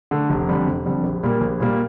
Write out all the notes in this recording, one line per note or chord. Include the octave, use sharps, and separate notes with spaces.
D3 A3
F1
F2 D3 G3
F1
F2 D3 G3
A#1
A#2 G3 A#3
A#1
A#2 G3 A#3